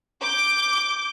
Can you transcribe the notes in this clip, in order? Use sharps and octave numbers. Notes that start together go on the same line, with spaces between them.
D6 G6